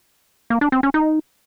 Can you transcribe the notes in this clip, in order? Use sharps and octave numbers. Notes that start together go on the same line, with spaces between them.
A#3
D4
C4
C#4
D#4